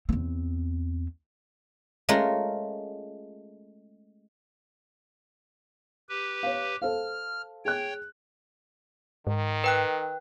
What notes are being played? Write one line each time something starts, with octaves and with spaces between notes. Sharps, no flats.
E2 C4
G#3 A3 C#4 F4 A#4
G4 B4
C#5 F5
A4 C5 F5 F6
G#4 C#5 G5 F#6
G#2 D#3
B4 G5 F#6